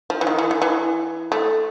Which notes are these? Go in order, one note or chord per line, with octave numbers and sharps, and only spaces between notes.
F3
E3
D#3
E3
E3
E3
A3